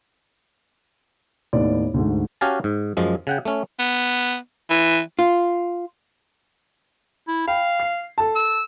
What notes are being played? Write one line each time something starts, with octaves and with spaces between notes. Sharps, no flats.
D#2 A2 B3 D#4 D5
D2 G#2
C#4 F#4 G4 F5 G#5 A5
G#2
F#2 F3 G#3
C#3 F#5 G5
A3 C#4
B3
E3
F4
E4
F5 G5 B5
C7
A4 A5
E6